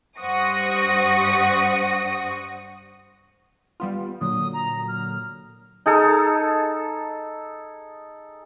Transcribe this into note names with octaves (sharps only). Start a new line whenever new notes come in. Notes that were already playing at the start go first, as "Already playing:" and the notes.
G2 C5 F#5 C#6 D#6 A#6
G3 B3 F4
A#2 D3 F#3 D#6
A#5
F6
D#4 G#4 A4